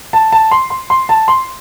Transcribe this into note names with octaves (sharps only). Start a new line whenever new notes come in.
A5
A5
C6
C6
C6
A5
C6